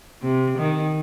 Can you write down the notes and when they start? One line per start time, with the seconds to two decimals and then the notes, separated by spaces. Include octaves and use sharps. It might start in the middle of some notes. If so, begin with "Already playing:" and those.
0.23 C3
0.58 D#3